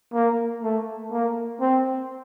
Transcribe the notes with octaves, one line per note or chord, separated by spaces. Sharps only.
A#3
A3
A#3
C4